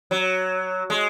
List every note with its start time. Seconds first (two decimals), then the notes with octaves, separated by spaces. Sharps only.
0.11 F#3
0.90 G#3